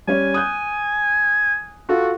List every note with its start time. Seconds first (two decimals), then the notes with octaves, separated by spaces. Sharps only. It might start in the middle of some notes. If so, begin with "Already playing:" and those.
0.07 G3 C#4 C#5 G#5
0.34 D#6 F#6 G6
1.89 F4 F#4 A4